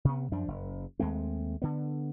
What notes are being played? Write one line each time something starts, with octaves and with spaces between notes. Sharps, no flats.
C3 B3
F#2 F3 D4
F#1
D#2 G#3 A3 C4
D3 B3